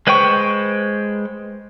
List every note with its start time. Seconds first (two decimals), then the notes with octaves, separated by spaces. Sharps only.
0.07 G#3 B4 C5 G5 C#6